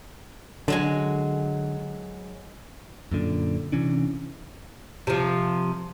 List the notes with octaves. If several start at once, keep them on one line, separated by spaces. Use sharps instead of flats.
D3 F#3 G#3 G#5
F#2 A#2 D3
C3 E3 C#4 D4
C3 F3